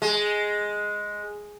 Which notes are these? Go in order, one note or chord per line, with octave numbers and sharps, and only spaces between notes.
G#3